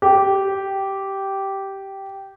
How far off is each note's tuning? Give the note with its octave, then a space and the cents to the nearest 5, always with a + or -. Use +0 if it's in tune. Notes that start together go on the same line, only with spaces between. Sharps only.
G4 -10